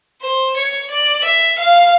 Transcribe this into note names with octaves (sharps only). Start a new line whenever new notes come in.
C5
C#5
D5
E5
F5